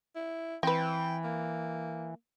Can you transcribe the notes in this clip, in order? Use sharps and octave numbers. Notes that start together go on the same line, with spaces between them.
E4
E3 C4 B4 G5
A#3